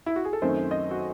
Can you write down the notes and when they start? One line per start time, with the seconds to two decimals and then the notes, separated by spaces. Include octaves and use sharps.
0.06 E4
0.16 F#4
0.25 G#4
0.33 A4
0.42 F#2 D#3 A3 C4 D#4 C5
0.71 D#5
0.91 F#4